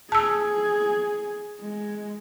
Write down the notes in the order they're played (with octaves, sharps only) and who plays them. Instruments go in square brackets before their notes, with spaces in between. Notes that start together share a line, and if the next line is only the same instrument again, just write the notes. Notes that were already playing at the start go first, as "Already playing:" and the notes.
[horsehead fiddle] G#4 [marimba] A5 E6
[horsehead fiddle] G#3